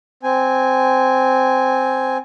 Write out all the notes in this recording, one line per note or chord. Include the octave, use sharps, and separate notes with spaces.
C4 G#5